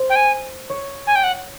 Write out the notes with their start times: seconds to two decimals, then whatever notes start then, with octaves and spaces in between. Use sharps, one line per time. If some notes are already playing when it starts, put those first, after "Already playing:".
Already playing: C5
0.10 G5
0.16 G#5
0.70 C#5
1.07 G#5
1.15 G5
1.24 F#5